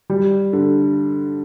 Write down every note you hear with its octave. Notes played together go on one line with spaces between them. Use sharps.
G3
D3